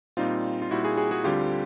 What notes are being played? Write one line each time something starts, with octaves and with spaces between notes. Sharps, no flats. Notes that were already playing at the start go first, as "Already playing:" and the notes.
A#2 G3 C4 D#4 F4
F4
A#2 G3 C4 E4 F#4
F#4 G#4
F#4 G#4
F#4 G#4
D2 D3 G3 C4 F4 G4